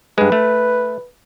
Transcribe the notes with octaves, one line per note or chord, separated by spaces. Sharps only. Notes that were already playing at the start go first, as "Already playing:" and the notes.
G2 G#3 B4
A3